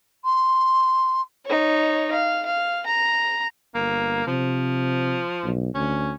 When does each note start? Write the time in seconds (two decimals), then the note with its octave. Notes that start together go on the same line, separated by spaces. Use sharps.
0.25 C6
1.46 D#4 C#5
2.11 F5
2.45 F5
2.86 A#5
3.75 G1 A#3
4.27 C3 F3
5.44 B1
5.75 D2 C#4